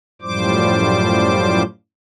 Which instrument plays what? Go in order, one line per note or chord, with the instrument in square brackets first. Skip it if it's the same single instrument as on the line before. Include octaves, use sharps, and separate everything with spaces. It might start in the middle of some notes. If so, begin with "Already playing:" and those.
[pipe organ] F#2 A2 F3 G3 C5 D6